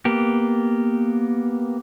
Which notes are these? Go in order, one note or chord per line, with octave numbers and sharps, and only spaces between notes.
A#3 B3 G4